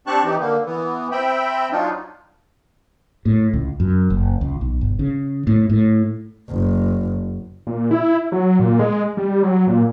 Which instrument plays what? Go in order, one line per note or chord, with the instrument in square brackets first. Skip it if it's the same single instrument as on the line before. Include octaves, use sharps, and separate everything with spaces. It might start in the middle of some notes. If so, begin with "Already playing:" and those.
[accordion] C4 D4 G4 A5 C#6 F#6
E3 D#4 G4
D3 A#3
E3 B3
C4 E5 G5 B5
F#3 D4 D#4 F4
[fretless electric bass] A2
C#2
F#2
F#1
C#2
B1
G1
C#3
A2
A2
[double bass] F#1
[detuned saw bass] A#2
E4
F#3
A#2
G#3
G3
F#3
A#2